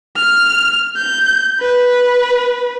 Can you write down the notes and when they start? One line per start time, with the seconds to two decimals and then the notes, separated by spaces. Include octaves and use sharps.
0.16 F6
0.96 G6
1.61 B4